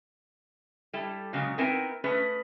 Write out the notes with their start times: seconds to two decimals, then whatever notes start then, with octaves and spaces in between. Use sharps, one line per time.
0.93 G3 E4 A4
1.33 A#2 C#3 F#3 G#3
1.58 B3 C4 D#4 E4 A#4 G#5
2.04 A3 C#4 G#4 B4